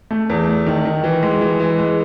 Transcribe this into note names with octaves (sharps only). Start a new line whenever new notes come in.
A3
E2
A3
D#3
D#3
E3
G#3
E3
E3
G#3